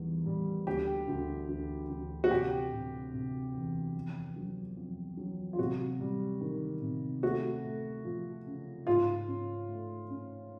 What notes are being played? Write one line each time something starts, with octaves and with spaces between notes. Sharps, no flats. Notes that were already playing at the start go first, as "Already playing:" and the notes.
Already playing: E2 D#3 G3
G3
D2 G4
D2
D2
D2
F#4
C3 G4
C3
C3
E2
F2
F#3
F2
F#3
F4
C3 F#4
G3
D#3
C3
A3 F#4
A3
F3
C#3
G#2 F4
C#4
A3
C#4